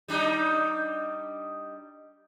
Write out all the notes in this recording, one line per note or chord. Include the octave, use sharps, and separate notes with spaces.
G3 D4 D#4